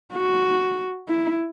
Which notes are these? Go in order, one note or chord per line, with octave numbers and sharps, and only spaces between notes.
F#4
E4